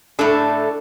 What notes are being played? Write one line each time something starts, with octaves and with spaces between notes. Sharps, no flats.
A2 A3 D4 A4